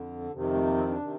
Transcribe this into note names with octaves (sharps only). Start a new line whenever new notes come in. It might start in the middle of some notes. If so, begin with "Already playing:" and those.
Already playing: F2 D3
F2 C3 D#3
C4
A3
A#3
C4
D4
C3 D#3